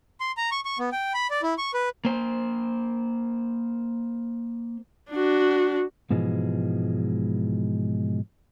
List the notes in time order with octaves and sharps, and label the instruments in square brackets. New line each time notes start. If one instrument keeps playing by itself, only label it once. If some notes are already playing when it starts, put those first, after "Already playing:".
[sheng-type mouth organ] C6
A#5
C#6
C#6
B3
G5
B5
D5
E4
C#6
B4
[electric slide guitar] A#3 C5
[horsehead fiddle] D4 F#4
[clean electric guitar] G#2 B2 E3 F3 G#3